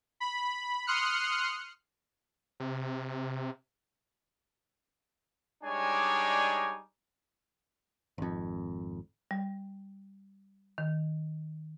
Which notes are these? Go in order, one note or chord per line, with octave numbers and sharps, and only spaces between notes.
B5
C6 D#6 F6 F#6 C#7
C3
G3 G#3 D4 D#4 C#5 G#5
G#1 F2
G3
D#3